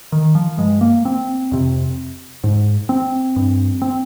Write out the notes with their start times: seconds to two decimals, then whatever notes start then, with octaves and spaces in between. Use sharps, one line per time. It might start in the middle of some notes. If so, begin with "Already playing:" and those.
0.12 D#3
0.35 F3
0.58 G2 G#3
0.81 A#3
1.05 C4
1.52 F2 C3
2.44 G#2
2.89 C4
3.36 G2
3.82 C4